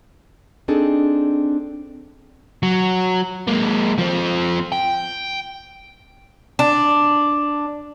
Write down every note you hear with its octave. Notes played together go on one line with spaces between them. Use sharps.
C4 D4 D#4 G#4 A4
F#3
G#3 A#3
F3 C4
G5
D4